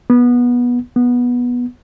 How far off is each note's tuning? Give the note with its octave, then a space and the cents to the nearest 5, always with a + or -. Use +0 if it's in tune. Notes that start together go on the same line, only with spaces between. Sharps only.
B3 -20
B3 -15